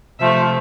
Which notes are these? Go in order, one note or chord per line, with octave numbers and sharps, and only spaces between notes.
C3 F3 A3 E5